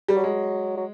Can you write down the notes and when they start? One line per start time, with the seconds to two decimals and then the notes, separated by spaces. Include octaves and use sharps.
0.09 G3
0.15 F#3
0.24 G#3
0.77 F#3